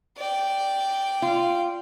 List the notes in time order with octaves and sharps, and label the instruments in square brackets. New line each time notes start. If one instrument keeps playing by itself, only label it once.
[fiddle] D5 G5
[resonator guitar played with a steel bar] F4